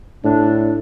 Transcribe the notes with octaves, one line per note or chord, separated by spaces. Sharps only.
A2 D4